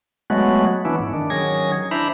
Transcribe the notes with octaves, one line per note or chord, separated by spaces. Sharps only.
F#3 G#3 A3 B3 F#4
E3 B3 C#4 D4 E4
G#2
D#3 D4
D#3 F#3 C#4 G#4 G#6 A#6
D4 E4 C5 E5 A#5 B5